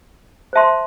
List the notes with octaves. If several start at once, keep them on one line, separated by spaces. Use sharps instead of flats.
C5 E5 A5 C6